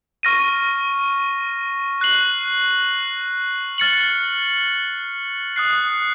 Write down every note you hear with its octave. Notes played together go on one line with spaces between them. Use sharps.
C#6 F6 A#6 D#7
F#6 C7 F#7
F6 A6 C#7 F#7
D#6 F#6 C7